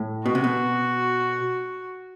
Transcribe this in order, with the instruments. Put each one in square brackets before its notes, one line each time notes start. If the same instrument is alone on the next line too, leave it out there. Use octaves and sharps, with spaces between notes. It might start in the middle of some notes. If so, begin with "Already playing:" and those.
Already playing: [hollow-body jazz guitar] A2
[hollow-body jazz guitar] B2 [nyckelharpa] F#4
[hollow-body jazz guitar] C3
B2